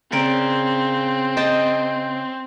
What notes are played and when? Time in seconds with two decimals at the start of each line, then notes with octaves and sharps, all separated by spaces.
0.12 C#3 C4 A#4 D5
1.37 D#5 G5 A5